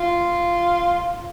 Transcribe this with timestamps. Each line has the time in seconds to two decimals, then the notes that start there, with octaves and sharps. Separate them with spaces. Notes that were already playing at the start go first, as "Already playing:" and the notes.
Already playing: F4